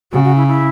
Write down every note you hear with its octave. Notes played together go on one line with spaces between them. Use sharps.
C#3 F#4
F#4
E4
E4